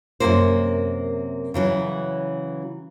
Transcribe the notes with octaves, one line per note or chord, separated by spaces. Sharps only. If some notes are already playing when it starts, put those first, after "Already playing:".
F#2 C3 E3 F3 A#3 C5
C#3 E3 F#3